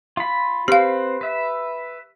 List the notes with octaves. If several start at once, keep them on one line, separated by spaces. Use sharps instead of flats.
F4 B5
C4 G4 B4 C5 F5
B4 E5